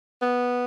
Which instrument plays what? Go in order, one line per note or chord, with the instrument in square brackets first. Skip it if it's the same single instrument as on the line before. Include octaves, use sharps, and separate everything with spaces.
[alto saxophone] B3